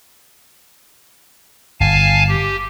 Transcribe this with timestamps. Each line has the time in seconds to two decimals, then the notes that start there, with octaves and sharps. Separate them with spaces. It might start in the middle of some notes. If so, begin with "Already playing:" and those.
1.80 G1 F5 G#5 A5
2.29 G4